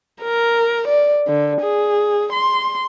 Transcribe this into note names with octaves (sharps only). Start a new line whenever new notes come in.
A#4
D5
D3
G#4
C6